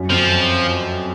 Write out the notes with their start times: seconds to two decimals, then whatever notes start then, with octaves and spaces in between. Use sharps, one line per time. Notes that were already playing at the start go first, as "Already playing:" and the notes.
Already playing: F#2
0.10 F2 F3